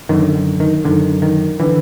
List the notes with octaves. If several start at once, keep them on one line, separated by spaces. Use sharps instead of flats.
F#2 D3 D#3
D#3
F#2 D3 D#3
D#3
D3 E3